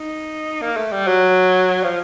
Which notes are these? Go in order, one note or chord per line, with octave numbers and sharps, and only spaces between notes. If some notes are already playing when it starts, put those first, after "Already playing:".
Already playing: D#4
A#3
A3
G3
F#3
F3